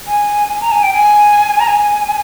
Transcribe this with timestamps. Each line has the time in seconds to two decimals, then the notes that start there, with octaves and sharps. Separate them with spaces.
0.07 G#5
0.61 A#5
0.72 G#5
0.83 G5
0.93 G#5
1.60 A#5
1.68 G#5